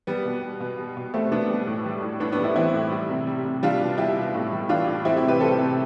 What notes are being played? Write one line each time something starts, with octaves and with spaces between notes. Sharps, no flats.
G3 B3
B2
G3
B2
G3
B2
G3 A3 C4
B2 B3 D4
G3
A2
G3
A2
A2 B3 D4
B3 D4
G3
C4 E4
E3 C4 E4
A2
G3
C3
G3
C3
G3 D4 F4
B2
G3 E4 G4
B2
A2
G3
E3 D4 F4
A2
G3 C4 E4
E4 G4
C3
G4 B4
G3 A4 C5
C3